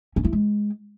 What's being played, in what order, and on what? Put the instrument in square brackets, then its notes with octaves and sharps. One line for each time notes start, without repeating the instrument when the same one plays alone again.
[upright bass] C#4
E4
G#3